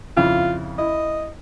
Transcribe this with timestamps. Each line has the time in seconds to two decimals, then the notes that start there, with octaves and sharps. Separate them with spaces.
0.17 F2 C#3 E4 F4
0.78 E4 D#5